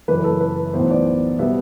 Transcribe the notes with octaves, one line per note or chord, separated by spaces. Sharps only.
F#1 F#2 E3 B4
A4
B4
B1 A2 E3 B3 C5
D5
B2 G3 B3 E5